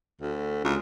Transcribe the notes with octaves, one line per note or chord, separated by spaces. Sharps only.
D2
C#2